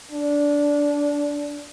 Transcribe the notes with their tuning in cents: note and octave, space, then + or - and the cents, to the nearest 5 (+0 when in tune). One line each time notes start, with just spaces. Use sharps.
D4 -15